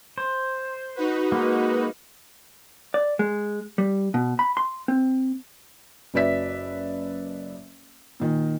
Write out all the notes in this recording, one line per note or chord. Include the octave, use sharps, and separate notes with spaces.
C5
D#4 F#4 B4
G#3 A#3
D5
G#3
G3
B2
B5
C6
C4
F#1 F#3 B4 D5 E5 B6
A#2 D#3